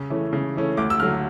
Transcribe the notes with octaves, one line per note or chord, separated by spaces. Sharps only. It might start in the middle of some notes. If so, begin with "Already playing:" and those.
Already playing: C#3
E3 A3 C#4
C#3
E3 A3 C#4
D2 D6
E6
D3 F#3 F6